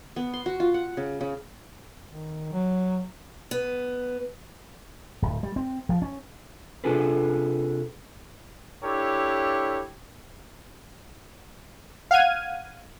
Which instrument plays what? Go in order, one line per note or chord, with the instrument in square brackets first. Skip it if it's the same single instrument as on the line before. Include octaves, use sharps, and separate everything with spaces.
[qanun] B3
C6
F#4
F4
F#5
C#3
C#3
[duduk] D#3
F#3
[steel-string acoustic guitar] B3
[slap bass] D1
G3
C4
F3
C#4
[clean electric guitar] C3 D4 F4 G#4 A4 B4
[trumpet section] D4 E4 G4 A4 C#5
[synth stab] F5 F#5 F6 G#6 D#7